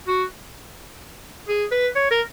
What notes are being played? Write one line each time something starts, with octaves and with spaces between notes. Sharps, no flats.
F#4
G#4
B4
C#5
A#4